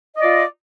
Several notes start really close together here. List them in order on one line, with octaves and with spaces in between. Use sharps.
D#5 D5 F4